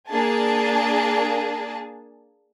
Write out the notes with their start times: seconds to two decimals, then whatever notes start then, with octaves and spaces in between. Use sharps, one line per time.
0.10 A#3 D4 G#4 G#5 A5